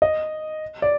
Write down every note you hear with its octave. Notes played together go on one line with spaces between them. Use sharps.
D#5
D5